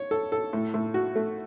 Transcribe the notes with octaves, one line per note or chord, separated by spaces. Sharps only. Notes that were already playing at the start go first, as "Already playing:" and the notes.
Already playing: C#5
A4
A4
A2
A2
F#4
A3